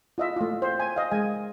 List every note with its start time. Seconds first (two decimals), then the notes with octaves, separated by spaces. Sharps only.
0.18 F4 D#5 E5
0.36 A3 F4
0.62 C5
0.80 G#5
0.96 D#5 F5
1.11 G#3 G#5